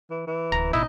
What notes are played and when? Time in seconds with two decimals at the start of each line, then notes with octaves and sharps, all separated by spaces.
0.10 E3
0.27 E3
0.52 D1 A#5
0.73 A1 B2 D#4 E4